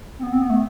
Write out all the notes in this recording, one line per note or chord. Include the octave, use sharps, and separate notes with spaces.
C4
B3
C4
B3
A3